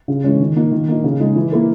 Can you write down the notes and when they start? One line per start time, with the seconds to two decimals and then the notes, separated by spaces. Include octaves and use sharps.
0.08 C#3
0.24 E3 G#3 C#4
0.40 D#3
0.56 A#3 D#4
0.72 D#3
0.88 A#3 D#4
1.04 C#3
1.20 G#3 D#4 G#4
1.36 E3
1.52 A#3 E4 A#4